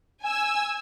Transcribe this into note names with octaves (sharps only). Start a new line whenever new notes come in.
G#5 E6